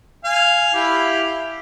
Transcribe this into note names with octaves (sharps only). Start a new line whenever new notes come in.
F5 G#5
E4 G4 F5